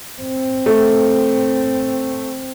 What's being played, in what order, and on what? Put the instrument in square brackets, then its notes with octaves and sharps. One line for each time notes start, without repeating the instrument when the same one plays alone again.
[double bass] C4
[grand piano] A3